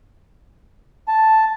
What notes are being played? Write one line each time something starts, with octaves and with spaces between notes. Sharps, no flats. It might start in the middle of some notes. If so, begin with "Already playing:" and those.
A5